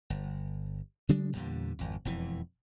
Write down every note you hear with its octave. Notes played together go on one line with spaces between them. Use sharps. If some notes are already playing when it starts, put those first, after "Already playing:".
G1
C#3 F#3 G#3 D4
E2 A#2 D3 G3
G#1 F2
E1 F2 E3